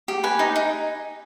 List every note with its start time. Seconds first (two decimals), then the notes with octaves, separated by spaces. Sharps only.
0.08 G4
0.24 B4 G#5
0.39 D#4
0.56 D#4